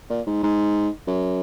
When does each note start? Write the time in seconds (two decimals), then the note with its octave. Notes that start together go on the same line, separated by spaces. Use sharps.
0.10 A#2
0.27 G#2
0.43 G#2
1.07 F#2